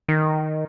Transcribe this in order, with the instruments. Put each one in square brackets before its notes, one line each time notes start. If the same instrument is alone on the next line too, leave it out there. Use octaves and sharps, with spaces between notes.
[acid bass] D#3